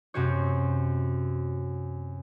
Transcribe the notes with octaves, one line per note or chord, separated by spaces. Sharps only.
F#2 C3 C4 F#4 C#5